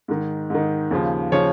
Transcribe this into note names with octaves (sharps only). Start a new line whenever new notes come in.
G#2 D#3
G#2 D#3
D#2 C#3 F3
C#3 F3 C#5